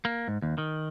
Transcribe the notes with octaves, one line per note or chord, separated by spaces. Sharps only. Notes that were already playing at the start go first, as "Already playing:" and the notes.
A#3
G#2
D#2
D#3